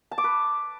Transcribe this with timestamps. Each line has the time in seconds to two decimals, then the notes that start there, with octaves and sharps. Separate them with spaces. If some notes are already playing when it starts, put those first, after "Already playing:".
0.11 A5
0.18 D6
0.24 B4